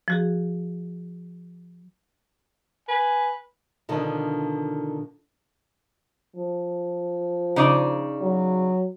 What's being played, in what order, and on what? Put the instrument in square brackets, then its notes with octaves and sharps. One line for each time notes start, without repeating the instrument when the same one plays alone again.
[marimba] F3 F#4 G#4
[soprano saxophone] B4 [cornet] G#5
[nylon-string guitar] B2 D3 D#3 F3 D4
[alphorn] F3
[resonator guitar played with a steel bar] C#3 D#4 D5
[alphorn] F#3